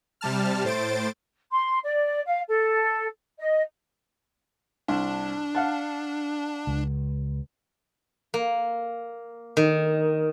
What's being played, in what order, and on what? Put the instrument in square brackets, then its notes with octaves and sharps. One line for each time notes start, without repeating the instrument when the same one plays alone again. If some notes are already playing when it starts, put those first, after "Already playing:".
[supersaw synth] C3 G3 A5 F6
A2 C5 A6 D7
[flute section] C6
D5
F5
A4
D#5
[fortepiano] C2 [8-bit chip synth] D4
[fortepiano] F5 F#5 A5
[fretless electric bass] C#2
[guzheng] A#3
D#3